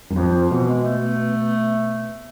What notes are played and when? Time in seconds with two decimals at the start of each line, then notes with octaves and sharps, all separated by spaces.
0.10 F#2
0.16 F2 F3
0.34 F3
0.51 B2 E3
0.67 G#3
0.84 A3